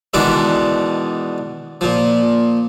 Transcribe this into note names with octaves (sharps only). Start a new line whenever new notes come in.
B2 D#3 E3 G#3 B3 D4
A#2 F3